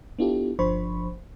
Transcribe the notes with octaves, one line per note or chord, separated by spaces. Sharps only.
B3 D4 E4 F4 G4 A4
G1 F3 D4 C5 B5 C#6